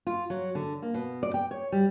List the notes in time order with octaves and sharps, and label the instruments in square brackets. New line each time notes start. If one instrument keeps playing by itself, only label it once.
[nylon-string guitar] F4
F#3
D3
A#3
B2
D5
G5
C#5
G3